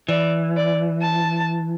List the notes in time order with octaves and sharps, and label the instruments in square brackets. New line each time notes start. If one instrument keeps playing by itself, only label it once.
[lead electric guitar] E3 [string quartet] D5
[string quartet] D5
A5